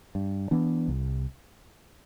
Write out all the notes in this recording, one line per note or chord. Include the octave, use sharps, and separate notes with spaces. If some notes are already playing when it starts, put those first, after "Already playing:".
G2
E3 B3 D4
C2